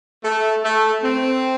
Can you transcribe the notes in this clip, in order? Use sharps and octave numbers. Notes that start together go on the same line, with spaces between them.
A3
A3
C4